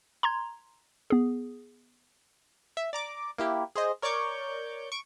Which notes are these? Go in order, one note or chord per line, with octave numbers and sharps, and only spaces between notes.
A#5 C6 G#6
B3 G#4
E5
D5 A#5 D6
A#3 E4 G4
G#4 C5 D#5
A#4 C#5 D5 C#6 D6 G6
C#6 D7